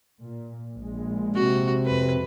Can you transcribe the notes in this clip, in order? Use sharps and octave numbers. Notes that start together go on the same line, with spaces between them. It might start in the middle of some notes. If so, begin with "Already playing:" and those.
A#2
A#1 G#3
C3 F#4
F2 B4